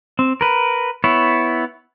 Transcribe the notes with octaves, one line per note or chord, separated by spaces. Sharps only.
C4
A#4 B4
B3 E4 C#5